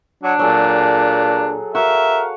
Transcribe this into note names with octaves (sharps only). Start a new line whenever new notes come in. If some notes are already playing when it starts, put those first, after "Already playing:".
F#3 D4
A#2 F#3 G#4 A4
F#4 A#4 E5 F5